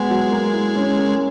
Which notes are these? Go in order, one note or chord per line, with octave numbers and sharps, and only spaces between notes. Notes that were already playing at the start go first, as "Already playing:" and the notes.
Already playing: F#3 G#3 B3 F#4
F#3
A#3
E4
C#4
A#4